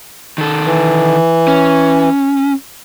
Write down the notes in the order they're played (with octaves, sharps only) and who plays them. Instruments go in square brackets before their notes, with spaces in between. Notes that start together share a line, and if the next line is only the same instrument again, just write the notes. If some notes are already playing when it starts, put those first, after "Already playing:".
[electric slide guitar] D#3 A4
[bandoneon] E3
[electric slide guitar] C#4